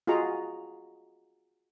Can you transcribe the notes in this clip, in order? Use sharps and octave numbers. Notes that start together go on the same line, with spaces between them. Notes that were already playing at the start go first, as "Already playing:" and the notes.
F4 F#4 G#4 D#5 A#5